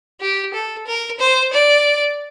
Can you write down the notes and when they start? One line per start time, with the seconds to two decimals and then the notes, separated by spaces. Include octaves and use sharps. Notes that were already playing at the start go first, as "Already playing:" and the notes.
0.21 G4
0.54 A4
0.87 A#4
1.19 C5
1.53 D5